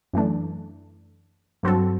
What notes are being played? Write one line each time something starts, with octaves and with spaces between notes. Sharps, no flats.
F#2 E3 A3 D4
G2 F#3 C4 F#4 A4